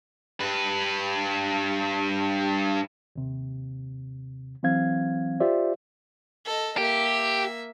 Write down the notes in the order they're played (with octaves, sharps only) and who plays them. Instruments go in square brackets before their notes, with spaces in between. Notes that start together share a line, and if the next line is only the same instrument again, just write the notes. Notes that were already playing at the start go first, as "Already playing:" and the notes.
[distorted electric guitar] G2 B4
[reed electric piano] D#2 C3
E3 F#3 C4 F5 G#6
F4 G4 C5 D5 E5
[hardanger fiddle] A4 D#5
[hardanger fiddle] A#3 E5 [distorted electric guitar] G4